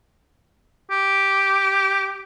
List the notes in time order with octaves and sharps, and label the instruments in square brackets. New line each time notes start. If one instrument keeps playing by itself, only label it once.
[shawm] G4